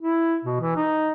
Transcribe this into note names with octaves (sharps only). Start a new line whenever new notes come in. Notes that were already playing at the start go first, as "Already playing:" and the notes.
E4
B2
E3
D#4